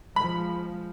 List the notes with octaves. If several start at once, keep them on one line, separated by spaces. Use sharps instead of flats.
F3 G#3 B5